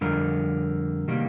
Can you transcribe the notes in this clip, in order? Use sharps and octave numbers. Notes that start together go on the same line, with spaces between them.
F2 D3 G3 A#4
C3 D#3 G3 A#3